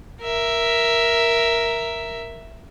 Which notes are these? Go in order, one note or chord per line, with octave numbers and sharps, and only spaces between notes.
A#4 E5